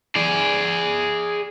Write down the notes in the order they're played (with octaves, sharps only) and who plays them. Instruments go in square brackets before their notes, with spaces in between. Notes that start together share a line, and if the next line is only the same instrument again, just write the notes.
[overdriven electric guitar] G#4 D5